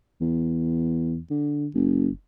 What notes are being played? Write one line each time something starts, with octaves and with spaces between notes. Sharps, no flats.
E2
D3
F#1